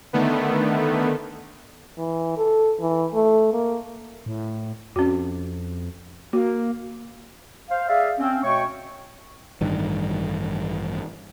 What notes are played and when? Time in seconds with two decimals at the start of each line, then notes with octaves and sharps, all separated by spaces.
0.13 D3 D#3 A3 B3
1.98 E3
2.37 A4
2.80 E3
3.14 A3
3.53 A#3
4.26 A2
4.96 F2 C#4 F#4
6.33 A#3 F#4
7.71 C5 F5
7.88 G#4 D5 E5 F5
8.19 C4 C#4
8.44 B2 A3 C#5 G5 C#6
9.61 A1 G2 D#3